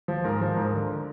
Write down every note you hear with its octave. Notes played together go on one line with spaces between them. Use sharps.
F3
G#2 A#4
F3
G#2
D3